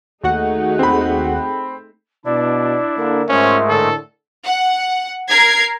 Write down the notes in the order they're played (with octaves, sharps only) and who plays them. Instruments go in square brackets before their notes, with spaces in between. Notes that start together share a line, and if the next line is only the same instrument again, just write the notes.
[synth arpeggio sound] D#2 F#4 F#5 [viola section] A3 D#4 G#4
[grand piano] C4 B5
[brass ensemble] B2 [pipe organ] D4 E4 [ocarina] D5
[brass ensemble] D3 A#3 [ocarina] A#4
[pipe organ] G#2 G#3 A3 [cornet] C#4 [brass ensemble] F4 C5 E5
[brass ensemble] A2 D3 [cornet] A4
[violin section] F#5
A#4 A#5 G#6 C7